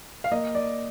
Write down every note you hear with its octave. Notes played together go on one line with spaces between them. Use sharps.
F5
A#3 D#5
D5